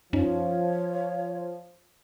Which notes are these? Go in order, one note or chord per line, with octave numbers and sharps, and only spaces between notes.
F#2 F3 C#4 D#4 C#5